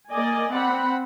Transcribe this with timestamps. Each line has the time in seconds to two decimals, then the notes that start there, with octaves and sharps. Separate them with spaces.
0.12 A#3 D5 D#5 G#5
0.54 C4 F#5 B5